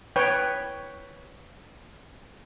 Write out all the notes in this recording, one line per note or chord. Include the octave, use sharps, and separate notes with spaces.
B4 C#5 G5